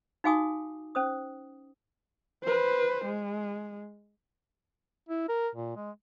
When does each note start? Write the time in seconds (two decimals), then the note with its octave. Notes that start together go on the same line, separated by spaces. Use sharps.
0.24 D#4 F#4 F5 G#5 D6 D#6
0.95 C#4 C5 D#6
2.44 B4 C5
3.05 G#3
5.09 E4
5.29 A#4
5.55 A#2
5.76 G#3